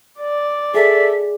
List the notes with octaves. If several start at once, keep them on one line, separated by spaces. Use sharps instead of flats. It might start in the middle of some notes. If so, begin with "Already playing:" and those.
D5
G#4 A4 E5